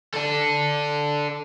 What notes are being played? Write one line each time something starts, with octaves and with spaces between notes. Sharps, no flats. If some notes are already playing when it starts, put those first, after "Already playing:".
D4 A4